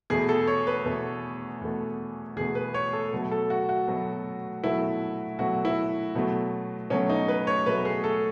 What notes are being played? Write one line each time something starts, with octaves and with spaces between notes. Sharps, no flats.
E2 B2 A3 G#4
A4
C#5
B4
E2 B2 A3
E2 B2 A3
E2 B2 A3 G#4
B4
C#5
A4
B2 F#3 A3
A4
F#4
F#4
B2 F#3 A3
B2 F#3 A3 E4
B2 F#3 A3 F#4
E4
B2 F#3 A3
B2 F#3 A3 C#4
D#4
B4
C#5
B2 F#3 A3 B4
G#4
A4